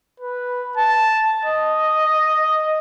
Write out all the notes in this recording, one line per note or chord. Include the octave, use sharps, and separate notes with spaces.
B4
A5
D#5